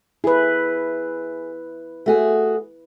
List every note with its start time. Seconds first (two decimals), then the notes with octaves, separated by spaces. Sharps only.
0.24 E4 G#4 B4
2.06 A3 F#4 G#4